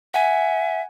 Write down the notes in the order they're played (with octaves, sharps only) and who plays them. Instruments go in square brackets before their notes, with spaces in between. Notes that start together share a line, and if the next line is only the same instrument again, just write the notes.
[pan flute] E5 [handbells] F#5 G#5